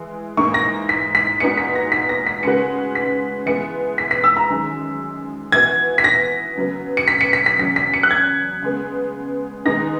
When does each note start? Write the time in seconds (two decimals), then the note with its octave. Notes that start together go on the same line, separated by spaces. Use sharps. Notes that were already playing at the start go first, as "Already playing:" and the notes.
Already playing: E3 G#3
0.37 G#2 E3 A#3 D#4 C#6
0.54 A#6
0.89 B6
1.15 B6
1.40 A#2 G#3 B3 D#4 F#4 C#7
1.57 B6
1.75 A#6
1.92 B6
2.09 A#6
2.26 B6
2.43 C#3 G#3 C#4 F#4 B4 C#7
2.95 B6
3.46 E3 G#3 B3 C#7
3.98 B6
4.11 B6
4.24 E6
4.37 A#5
4.50 F#2 D#3 G#3
5.52 E3 B3 F#4 G#6
5.98 B6
6.04 A#6
6.56 C#3 F#3 B3
6.97 C#7
7.08 B6
7.21 C#7
7.33 B6
7.46 B6
7.59 E2 C#3 F#3 B6
7.76 B6
7.94 C#7
8.03 F#6
8.11 G#6
8.62 C#3 G#3 B3
9.65 D#3 G#3 B3 D#4 A#6